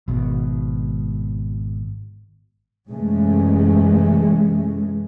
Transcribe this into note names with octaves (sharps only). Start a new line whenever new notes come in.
G#1 B2
F#2 C3 E3 G#3 A3 C#4